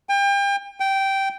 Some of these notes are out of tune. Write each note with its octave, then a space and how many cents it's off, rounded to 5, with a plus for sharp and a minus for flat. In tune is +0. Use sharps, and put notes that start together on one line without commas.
G5 +35
G5 -10